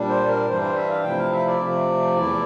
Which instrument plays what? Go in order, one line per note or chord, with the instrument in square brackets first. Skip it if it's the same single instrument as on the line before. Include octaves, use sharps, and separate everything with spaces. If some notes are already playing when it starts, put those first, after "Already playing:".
Already playing: [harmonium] A#2 G3 D4
C5
A#4
G2 E3 G3 D4 C5
C5
E5
F5
C3 F3 A3 E4 G5
F5
E5
D5
C3 F3 A3
E2 E3 A3 E4